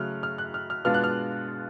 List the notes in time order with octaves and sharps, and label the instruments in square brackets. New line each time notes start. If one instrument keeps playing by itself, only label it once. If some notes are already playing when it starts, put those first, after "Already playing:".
Already playing: [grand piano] C#3 F#3 A3 F6 F#6
F6
F#6
F6
F6
B2 G#3 B3 D4 F4 F6
F#6
F6